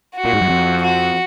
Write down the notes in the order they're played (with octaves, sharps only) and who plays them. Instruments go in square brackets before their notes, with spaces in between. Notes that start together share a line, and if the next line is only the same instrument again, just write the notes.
[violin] F#4
[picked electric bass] A#2
G#2
F#2
F2
[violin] F#4